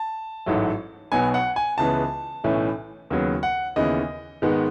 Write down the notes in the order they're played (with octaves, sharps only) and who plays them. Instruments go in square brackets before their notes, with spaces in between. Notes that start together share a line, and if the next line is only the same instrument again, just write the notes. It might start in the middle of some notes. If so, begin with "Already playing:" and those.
Already playing: [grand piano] A5
A1 G#2 F#3 A3
B1 B2 F#3 B3 G#5
F#5
G#5
C#2 C#3 E3 B3 A5
B1 A2 E3 A3 C#4
D#2 C#3 F#3 B3
F#5
D#2 C#3 E3 B3 D#5
G#2 D#3 G#3 B3